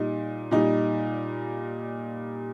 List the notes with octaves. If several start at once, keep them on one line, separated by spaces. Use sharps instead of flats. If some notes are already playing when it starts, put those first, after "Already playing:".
Already playing: A#2 G3 D#4
A#2 G3 D#4